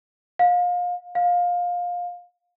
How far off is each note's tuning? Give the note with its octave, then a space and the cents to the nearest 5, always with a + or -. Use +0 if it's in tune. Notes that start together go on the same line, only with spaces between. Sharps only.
F5 +30
F5 +20